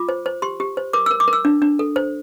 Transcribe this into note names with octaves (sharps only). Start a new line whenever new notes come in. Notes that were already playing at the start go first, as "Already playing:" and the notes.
Already playing: F4 D6
C5
C5
G4 C6
G4
C5
A#4 D6
A#4 E6
D6
A#4
E6
D4
D4
A4
C5